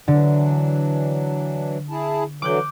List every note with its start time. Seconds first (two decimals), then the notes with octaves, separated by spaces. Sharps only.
0.08 D3 E3 F#3 D4
1.90 E4 G#4 A5
2.42 D3 E3 F#3 D6 F#6 G6